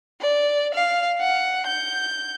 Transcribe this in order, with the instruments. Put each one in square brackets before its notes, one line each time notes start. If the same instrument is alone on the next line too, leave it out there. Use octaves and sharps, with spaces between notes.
[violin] D5
F5
F#5
G6